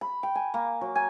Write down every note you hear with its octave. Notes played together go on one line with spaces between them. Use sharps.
B5
G5
G#5
A#3
F#3
G#5